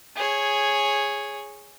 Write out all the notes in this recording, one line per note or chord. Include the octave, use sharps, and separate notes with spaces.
G#4 C#5